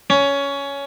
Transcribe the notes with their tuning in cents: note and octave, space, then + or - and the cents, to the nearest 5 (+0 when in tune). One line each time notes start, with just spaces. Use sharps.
C#4 +15